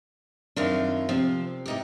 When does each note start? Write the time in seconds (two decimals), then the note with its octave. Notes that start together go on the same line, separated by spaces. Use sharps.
0.56 F#2 D#3 C4 D4 F4
1.09 C3 F3 C4
1.66 A2 D#4 G4